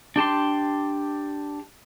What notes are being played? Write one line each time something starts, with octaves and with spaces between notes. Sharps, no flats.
D4 G4 A5 C6